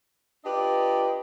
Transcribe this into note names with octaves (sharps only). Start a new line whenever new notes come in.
D4 F4 G4 B4 D5 D#5